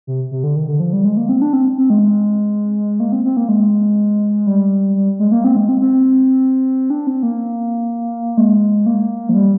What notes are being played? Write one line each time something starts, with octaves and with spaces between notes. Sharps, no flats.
C3
C3
D3
D#3
D3
F3
G3
G#3
A#3
C4
D4
C4
C4
G#3
A#3
C4
C4
A#3
G#3
G3
G3
G#3
A#3
C4
G#3
C4
C4
D4
C4
A#3
G#3
A#3
F3
G3